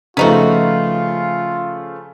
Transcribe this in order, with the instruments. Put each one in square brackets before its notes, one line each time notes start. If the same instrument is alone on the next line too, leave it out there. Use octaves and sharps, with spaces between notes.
[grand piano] C#3 F3 A3 [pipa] B3 D#4 F#4 [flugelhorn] F4